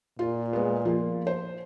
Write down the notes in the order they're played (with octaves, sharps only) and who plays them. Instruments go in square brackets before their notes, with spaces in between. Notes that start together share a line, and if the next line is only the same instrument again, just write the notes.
[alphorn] A#2 [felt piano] F4
[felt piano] G#3 B3
F3 A#3 F4
C5